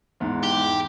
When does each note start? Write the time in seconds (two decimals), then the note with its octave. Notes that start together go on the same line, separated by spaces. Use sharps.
0.20 E2 G#2
0.43 G4